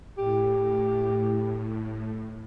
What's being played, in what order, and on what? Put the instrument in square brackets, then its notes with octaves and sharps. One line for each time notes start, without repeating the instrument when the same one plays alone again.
[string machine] A2 [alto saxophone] G4